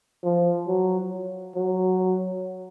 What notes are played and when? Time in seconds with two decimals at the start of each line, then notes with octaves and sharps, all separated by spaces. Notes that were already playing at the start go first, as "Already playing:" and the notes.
0.24 F3
0.67 F#3
1.55 F#3